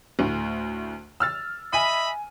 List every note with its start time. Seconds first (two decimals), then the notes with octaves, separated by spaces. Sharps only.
0.19 D2 A2
1.20 E6 F6 A6
1.73 D#5 E5 G#5 B5 D#7